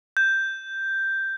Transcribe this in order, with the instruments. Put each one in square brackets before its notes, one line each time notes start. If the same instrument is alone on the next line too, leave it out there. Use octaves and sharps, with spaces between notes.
[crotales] G6